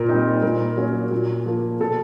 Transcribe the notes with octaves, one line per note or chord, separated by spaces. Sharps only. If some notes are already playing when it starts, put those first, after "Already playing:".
Already playing: A#2 A#4
G3 C4 D#4
A#2 A#4
F#3 A#3 C#4
A#2
F3 A#3
B2 A4